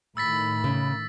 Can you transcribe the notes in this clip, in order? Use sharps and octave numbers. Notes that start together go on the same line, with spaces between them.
A2 D#3 B5 E6 A6 B6
C#3